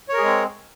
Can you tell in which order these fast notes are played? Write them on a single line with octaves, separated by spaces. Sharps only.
C#5 A#4 G#4 G#3 C4